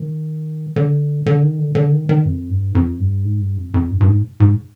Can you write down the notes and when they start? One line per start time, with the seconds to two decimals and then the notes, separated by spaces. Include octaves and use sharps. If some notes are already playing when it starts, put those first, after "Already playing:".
Already playing: D#3
0.76 D3
1.26 D3
1.42 D#3
1.58 D3
1.75 D3
1.92 D#3
2.09 D#3
2.25 F2
2.50 G2
2.75 F2
3.00 G2
3.24 G#2
3.40 G2
3.57 F2
3.74 F2
3.90 G2
4.00 G2
4.07 G#2
4.40 G#2